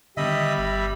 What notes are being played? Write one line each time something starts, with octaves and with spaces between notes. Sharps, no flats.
D3 D#3 G3 B3 D#5 E5 B5
G1 E5